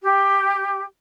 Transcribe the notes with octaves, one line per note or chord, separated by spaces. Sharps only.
G4